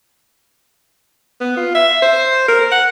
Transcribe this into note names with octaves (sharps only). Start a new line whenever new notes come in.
B3
F4
E5
C5
A#4
F#5